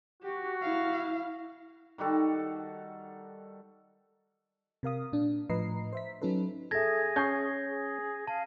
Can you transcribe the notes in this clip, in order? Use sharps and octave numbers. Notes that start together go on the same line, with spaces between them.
F#4 G4
E4 F5
D#3 G3 F#4 A4
C3 A#4 F5 D#6
A#2 D4
A2 F3 B4 D#5 A#5 C7
C5 E5 B6
F#3 C#4 D#4 A4 B4
G#4 A4 E5 G#6 A#6
C#4 G6 C7
G#4
F5 A5